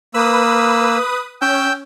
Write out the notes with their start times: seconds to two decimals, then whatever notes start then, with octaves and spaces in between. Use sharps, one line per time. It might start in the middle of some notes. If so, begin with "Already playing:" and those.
0.14 A#3 B4 D#6 E6
1.42 C#4 G5 E6 G6